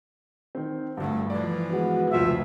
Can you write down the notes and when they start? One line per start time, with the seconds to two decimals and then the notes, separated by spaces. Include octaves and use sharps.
0.55 D#3 C4
0.97 G1 D2 G2 A3
1.30 E3 F3 D5
1.70 G#3 B3 F#4
2.11 F1 C#2 F3 E5